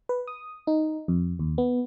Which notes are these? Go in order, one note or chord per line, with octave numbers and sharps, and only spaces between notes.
B4
D#6
D#4
F2
D#2
B3